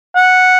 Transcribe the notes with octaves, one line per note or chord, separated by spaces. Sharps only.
F#5